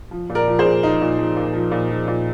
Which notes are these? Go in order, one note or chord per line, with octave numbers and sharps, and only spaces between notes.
F3
A#2
A#4 D5
F3
G#4 C5
A#2
F3 D#4
A#2
F3
A#2
F3
A#2
F3
A#2